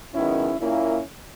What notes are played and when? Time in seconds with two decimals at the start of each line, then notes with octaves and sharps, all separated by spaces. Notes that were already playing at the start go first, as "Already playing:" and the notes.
0.15 F#2 D#3 G#3 B3 C#4 E4
0.60 A#2 A#3 C#4 E4